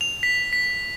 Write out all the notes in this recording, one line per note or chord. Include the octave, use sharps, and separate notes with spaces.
F7
B6
B6